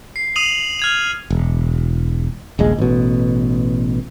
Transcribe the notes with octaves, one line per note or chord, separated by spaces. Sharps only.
C7
D#6 C7 D#7 F7 F#7
F6 G#6 F7
E1
D#1 A#1 G#3
A1 B2